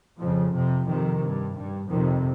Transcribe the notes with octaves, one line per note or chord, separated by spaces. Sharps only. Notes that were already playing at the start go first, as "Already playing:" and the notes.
F2 C#3 F3
F2 C3
F2 C3 D#3
G2
G2
F2 C3 D#3